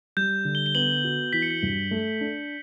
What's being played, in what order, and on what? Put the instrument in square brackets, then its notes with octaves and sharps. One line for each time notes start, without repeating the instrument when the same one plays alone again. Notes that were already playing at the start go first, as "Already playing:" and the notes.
[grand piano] G3 [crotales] G6
[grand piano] D3
[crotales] G7
G7
[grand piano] B3 [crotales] F#7
[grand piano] F#4
[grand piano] E3 [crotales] B6
[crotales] C#7
B6
[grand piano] G2
A3
D4